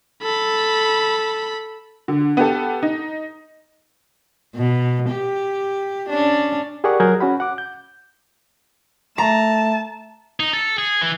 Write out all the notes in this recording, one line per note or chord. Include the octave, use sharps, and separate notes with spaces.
A4 B5
D3
B3 G4 A4
D#4
B2
G4
C#4 D4
G4 G#4 A#4 D5 F#5 C#6
F#3 G#4 A#4 F#5 G6 G#6
C#4 F#4 F#5 B5
F#5 D6
G6
A3 A5 A#5
D#4
A4
G#4
E3